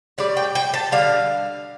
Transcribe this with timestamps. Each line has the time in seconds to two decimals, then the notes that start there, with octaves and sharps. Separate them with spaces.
0.18 A2 G3 D5
0.37 G5
0.55 G5
0.74 A5
0.92 D3 G3 F5